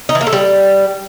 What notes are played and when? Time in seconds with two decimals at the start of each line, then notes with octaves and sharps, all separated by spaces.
0.09 D#4
0.15 E3
0.21 A#3
0.27 A4
0.33 G3